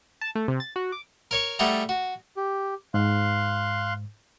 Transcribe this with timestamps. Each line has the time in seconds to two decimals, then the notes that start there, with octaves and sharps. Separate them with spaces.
0.21 A5
0.35 A3
0.48 C3
0.60 A6
0.76 F#4
0.92 D6
1.31 A#4 C#5 C#6
1.59 G3 A3 G#4 F#5 A#5
1.89 F#4
2.37 G4
2.94 G#2 F5 C6 F#6